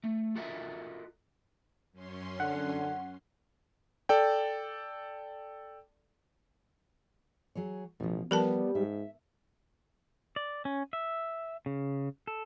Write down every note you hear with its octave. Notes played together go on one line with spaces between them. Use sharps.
A3
F4 F#4 A4 A#4 D#5 E5
F#2 C#4 C6
D3 F#5
A4 D5 G5
F#3 G#4 C#5
A1 B2 F3
F3 G3 B3 A#4 B4 A5
G#2 E5
D5
C#4
E5
C#3
A4